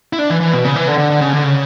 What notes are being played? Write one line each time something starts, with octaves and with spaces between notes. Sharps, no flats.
E4
D4
E3
E3
B2
C#3
E3
D3
D3
D3
C#3
D3
C#3